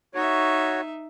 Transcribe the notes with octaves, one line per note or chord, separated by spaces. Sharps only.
D#4 F#4 C#5 E5